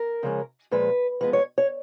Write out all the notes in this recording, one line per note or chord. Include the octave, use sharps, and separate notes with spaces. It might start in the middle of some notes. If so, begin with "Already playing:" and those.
Already playing: A#4
C#3 F3 G#3 C#4
A#2 F3 G#3 B4
F3 G#3 B3 B4
C#5
C#5